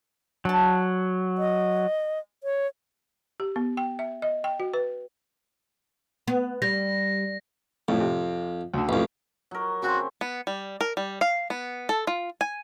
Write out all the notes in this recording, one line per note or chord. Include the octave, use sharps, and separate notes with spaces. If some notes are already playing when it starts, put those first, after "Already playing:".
F#3 D4 A5
D#5
C#5
G4
B3
G5
E5
D#5
G5
F#4
B4
B3
G3 A#6
F2 A2 A3
C3
D2 D3
A1 F2
F#3 A#4
C#3 C4 F#4
B3
G3
A#4
G3
F5
B3
A4
F4
G#5